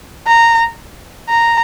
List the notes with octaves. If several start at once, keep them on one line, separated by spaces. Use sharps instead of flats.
A#5
A#5